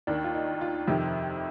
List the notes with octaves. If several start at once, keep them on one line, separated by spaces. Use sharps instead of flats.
D#2 D#3 D4
F4
D#4
D#4
F4
F2 C3 D#3 G4